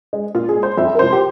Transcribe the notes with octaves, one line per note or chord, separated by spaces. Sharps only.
G#3
A#2 F4
G#4
G#3
C5
F2 E5
A#4
C3 F3 C5
G4